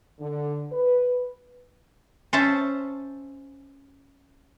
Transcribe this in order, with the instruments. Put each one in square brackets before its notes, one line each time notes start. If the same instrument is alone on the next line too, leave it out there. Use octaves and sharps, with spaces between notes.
[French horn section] D3
B4
[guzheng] C#4 C5 E5 A5